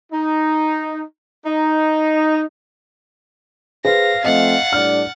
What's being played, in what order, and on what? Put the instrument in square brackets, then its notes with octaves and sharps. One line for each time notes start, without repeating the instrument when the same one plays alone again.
[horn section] D#4
D#4
[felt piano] G#4 B4 C5 [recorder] F5 [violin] A#6
[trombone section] F3 A3 C4 [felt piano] D#5 [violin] F#5 A6
[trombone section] A2 G3 D4 [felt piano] F6